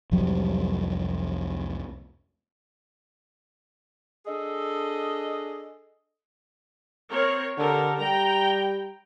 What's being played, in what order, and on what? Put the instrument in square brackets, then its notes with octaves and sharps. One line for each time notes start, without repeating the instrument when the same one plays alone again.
[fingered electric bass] C2 F2 F#3 G3
[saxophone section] D4 G#4 A4 D#5
[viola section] C4 A#4 C#5
[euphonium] D3 [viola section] G4 A4 A#4
[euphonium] G3 [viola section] G5 A#5